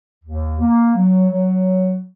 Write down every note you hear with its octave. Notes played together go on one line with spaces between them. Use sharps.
D#2
A#3
F#3
F#3